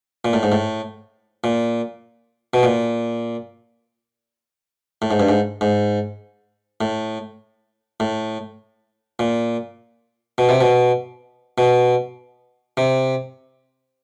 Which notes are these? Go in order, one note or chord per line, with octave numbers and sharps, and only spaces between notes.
A#2
A2
G#2
A2
A#2
B2
A#2
A2
G#2
G2
G#2
G#2
A2
A2
A#2
B2
C3
B2
B2
C3